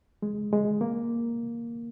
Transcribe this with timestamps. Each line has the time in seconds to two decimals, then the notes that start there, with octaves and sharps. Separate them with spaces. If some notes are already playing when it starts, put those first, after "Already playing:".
0.22 G#3
0.53 G#3
0.81 A#3